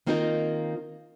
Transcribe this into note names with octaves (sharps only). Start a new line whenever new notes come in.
D#3 A#3 C4 D#4 F4 A#4